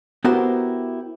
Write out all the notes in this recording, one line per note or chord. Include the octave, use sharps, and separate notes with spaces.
B3 E4 F#4 G4 A#4 C5